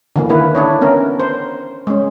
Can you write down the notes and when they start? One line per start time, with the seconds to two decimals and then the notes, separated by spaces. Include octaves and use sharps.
0.16 D3 E3 A#3
0.29 D3 D#3 A#3 E4 B4
0.55 D4 E4 C#5
0.81 B3 C#4 A#4
1.20 C5
1.87 G#3 C#4